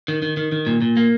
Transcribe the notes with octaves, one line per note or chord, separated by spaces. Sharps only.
D#3
D#3
D#3
D#3
A#2
A#2
A#3